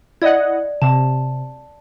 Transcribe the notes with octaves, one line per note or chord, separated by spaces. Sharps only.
E4 D5 D#5 F#5 G#6
C3 A5